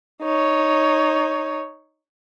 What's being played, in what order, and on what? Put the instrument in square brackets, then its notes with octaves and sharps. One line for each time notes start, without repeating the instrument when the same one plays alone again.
[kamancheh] D#4 C#5